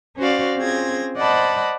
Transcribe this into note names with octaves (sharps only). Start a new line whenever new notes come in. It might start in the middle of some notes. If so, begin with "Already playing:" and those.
C#4 F#4 C5 D5 F5
C4 C#4 F4 G#4 G#6 A#6
C5 D5 D#5 F#5 A5 B5